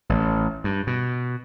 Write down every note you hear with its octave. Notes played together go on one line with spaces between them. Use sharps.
A1
G2
B2